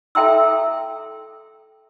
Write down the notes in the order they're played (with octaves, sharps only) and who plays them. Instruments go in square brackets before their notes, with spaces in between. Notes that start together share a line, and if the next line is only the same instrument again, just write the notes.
[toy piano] A4 E5 G5 A#5 C6 E6